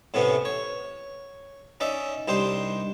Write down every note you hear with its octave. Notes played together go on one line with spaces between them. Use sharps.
A2 C3 A3 B3 C#4
C#5
C#4 D#4 D5 E5
C2 D4 D#4 G4 C5